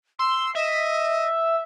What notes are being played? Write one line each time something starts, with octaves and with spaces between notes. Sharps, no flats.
C6 E6
D#5 E5